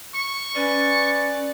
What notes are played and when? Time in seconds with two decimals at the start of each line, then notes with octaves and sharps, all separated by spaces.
0.15 C#6
0.56 C#4 B4 D5